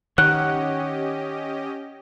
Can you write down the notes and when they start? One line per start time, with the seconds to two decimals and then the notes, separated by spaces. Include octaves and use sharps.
0.18 D#3 C#4 G4 C#5 D#5 F#5 F6 F#6